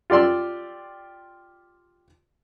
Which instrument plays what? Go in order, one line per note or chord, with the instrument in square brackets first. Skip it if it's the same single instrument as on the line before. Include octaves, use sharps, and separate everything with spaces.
[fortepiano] F4 G4 D5 C6 E6